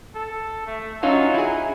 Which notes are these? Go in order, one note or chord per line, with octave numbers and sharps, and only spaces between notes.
A4
A3
F#3 C#4 D#4 F4
E4 G#4